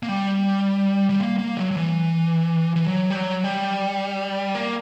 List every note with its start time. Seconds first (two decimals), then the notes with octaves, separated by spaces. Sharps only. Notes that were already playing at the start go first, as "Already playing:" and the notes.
0.03 A#3
0.09 G3
1.09 G3
1.20 A#3
1.39 A#3
1.57 F#3
1.71 F#3
1.77 E3
2.76 E3
2.87 F#3
3.10 G3
3.15 F#3
3.44 G3
4.55 A#3